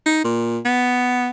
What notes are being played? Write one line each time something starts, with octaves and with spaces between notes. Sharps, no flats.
D#4
A#2
B3